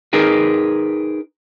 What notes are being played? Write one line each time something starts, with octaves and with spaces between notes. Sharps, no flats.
D#4 G#4 A#4 B4